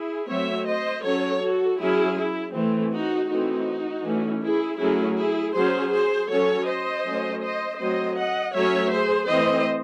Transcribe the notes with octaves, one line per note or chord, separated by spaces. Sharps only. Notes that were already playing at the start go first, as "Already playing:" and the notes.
Already playing: E4 G#4
F#3 A3 C4 C#5 E5
C5 D#5
F#3 C#4 A4 C#5
F#4 A4
F#3 C#4 E4 G#4
E4
E3 A3 C4
D#4 F#4
E3 A3 C4 D#4 F#4
E3 A3 C#4
E4 G#4
F#3 A3 C#4 E4 G#4
E4 G#4
F#3 C#4 G#4 C5
G#4 C5
F#3 C#4 A4 C#5
C5 D#5
F#3 A3 C#4
C5 D#5
F#3 A3 C4 C5 D#5
D#5 F#5
F#3 A3 C#4 C#5 E5
G#4 C5
E3 A3 C4 C5 D#5